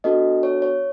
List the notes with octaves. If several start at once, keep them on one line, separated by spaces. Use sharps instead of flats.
B3 D4 F#4 A4 D#5
C#5
C#5